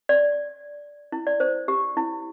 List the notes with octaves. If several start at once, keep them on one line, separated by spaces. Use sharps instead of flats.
D5
E4
D5
C5
G4
E4